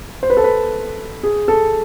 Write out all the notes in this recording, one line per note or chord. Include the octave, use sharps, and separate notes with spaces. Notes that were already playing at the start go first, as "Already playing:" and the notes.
C5
B4
A4
B4
G#4
A4